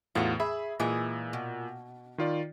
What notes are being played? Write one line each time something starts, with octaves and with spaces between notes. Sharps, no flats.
E2 A2 F4 F#4
G#4 E5 B5
A#2 E3 G#3 G#4
B2
D#3 F4 D5